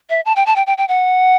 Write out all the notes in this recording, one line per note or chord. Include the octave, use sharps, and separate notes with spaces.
E5
A5
G5
A5
G5
G5
G5
F#5